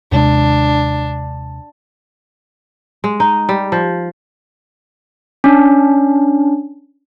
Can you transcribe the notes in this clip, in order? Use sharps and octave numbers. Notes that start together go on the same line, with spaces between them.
D#2 C3 G#3 D4
G#3
D#4
G3
F3
C#4 D4